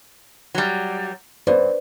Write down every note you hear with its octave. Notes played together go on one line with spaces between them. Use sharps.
F#3 G3
G2 B4 C5 D5